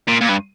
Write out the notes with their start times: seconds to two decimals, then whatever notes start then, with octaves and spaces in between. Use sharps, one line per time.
0.08 A#2
0.21 A#2
0.29 G2